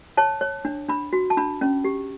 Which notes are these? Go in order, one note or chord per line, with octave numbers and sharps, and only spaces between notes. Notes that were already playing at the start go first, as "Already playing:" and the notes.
C#5 A5
C#5
D4
D4 B5
F#4
A5
D4 B5
C#4
G4